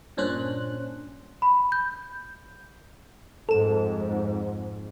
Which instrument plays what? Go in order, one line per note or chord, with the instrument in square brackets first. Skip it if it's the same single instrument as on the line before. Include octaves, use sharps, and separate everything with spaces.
[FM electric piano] G2 A#2 C#4 D4 C5 F#6
[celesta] B5
G6
[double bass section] F2 G#2 [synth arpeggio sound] A4 E7